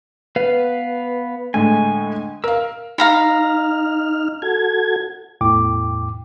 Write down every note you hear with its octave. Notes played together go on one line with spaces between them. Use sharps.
B3 B4 F5
A2 D3 G#3 G#5
A#4 F5 E6
D#4 F5 A#5 B5 F6
F#4 A4 G#6
E2 A2 G5 D6